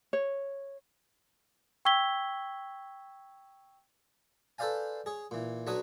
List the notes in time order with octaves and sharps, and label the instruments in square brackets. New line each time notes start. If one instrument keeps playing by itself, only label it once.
[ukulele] C#5
[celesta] G5 C#6 E6 G#6 B6 G7
[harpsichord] A4 B4 C5 D5 F5 G#5
G#4 C#5
A#2 E3
B1 F#3 D4 B4 C#5 D#6